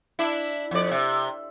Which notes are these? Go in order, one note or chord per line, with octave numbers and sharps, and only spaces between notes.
D4 E4
F2 D5
C3